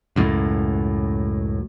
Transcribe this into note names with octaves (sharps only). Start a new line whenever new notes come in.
C#2 F#2 A2